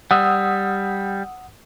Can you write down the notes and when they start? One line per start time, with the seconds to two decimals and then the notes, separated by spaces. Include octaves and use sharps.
0.11 G3 F#5 D#6 E6